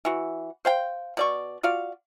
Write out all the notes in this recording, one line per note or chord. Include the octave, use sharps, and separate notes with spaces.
E3 F#4
C5 F5 G5
B2 D5 C#6
F4 F#4 D5 F5